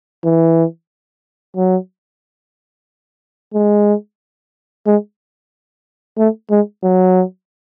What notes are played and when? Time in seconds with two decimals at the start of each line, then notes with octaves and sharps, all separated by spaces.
0.25 E3
1.56 F#3
3.54 G#3
4.86 G#3
6.18 A3
6.50 G#3
6.83 F#3